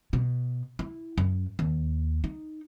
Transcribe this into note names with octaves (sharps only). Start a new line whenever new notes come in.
B2
E4
F#2
D#2
D#4